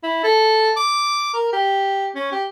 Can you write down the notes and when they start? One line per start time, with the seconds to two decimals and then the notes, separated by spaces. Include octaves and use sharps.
0.03 E4
0.24 A4
0.77 D6
1.34 A#4
1.53 G4
2.15 C#4
2.32 G4